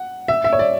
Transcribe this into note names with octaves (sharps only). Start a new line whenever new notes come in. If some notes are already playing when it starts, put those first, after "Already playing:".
Already playing: F#5
E5
E5
C#5
D5